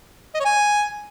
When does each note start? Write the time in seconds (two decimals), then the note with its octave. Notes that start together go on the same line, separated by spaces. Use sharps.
0.35 D#5
0.40 C#5
0.45 G#5